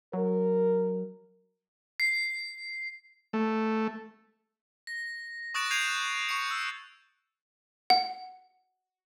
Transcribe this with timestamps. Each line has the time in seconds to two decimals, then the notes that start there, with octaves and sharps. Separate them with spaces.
0.13 F#3 A#4
2.00 C7
3.33 A3
4.87 A#6
5.54 C#6 D#6 F#6 A6 D7 E7
5.71 G6 G#6 C7 D7 D#7 F7
5.88 F#6
6.29 C#6 C#7
6.51 E6
7.90 F#5